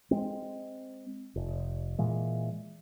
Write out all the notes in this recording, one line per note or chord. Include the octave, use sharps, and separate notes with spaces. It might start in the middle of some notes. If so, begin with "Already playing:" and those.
G#3 C4
F1
A#2 E3 G#3